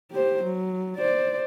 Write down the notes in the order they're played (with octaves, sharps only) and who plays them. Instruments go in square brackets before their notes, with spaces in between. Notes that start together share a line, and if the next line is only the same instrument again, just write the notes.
[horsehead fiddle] G4 C5
F#3
C5 D5